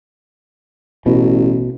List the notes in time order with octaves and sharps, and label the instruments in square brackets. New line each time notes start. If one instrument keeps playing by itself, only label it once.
[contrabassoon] A1 [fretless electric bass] B2